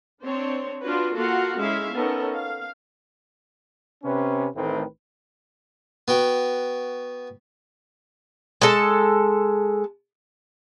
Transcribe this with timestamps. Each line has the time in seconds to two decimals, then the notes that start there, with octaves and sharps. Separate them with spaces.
0.21 C4 D4 C5 C#5
0.81 D4 F4 F#4 B4 C#5
1.13 A#3 F4 F#4 A4 F5 F#5
1.58 G#3 C#4 E4 E5 F5
1.93 B3 C#4 D#4 A4 A#4
2.32 F5
4.04 C3 C#4 B4
4.55 A1 A2 D#3 A3 C4 B4
6.08 B3 F#4 G5
8.62 G#3 A4 A5